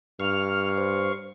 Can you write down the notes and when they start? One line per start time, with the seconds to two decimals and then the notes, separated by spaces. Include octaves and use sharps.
0.20 G2 F5 C#6 F6
0.78 C5